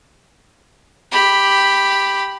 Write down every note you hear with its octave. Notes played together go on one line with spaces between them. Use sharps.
G4 B5